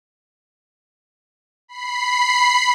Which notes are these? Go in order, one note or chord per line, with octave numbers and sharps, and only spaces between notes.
B5 C7